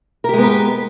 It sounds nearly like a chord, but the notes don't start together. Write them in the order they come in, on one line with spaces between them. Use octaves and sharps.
A#4 G4 G#3 B3 B4